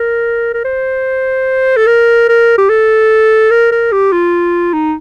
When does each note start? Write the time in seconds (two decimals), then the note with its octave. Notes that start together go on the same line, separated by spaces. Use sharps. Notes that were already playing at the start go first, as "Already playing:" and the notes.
Already playing: A#4
0.54 A#4
0.64 C5
1.77 A4
1.87 A#4
2.28 A#4
2.58 G4
2.69 A4
3.50 A#4
3.72 A#4
3.92 G4
4.12 F4
4.73 D#4